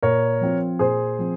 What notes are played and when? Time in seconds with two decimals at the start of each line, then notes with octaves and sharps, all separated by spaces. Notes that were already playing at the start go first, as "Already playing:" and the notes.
0.03 A#2 A#4 C#5
0.41 F3 C4 F4
0.79 A#2 G#4 C5
1.19 F3 C4